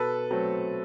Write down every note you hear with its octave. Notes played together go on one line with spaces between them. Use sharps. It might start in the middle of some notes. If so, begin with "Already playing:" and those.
Already playing: B2 A4 B4
F#3 A3 C4